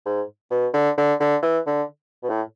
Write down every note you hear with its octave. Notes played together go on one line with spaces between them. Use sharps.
G#2
B2
D3
D3
D3
E3
D3
B2
A2